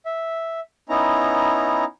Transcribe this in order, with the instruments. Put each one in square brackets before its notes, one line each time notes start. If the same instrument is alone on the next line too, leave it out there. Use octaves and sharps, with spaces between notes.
[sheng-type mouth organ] E5
B3 C#4 D#4 E4 A#5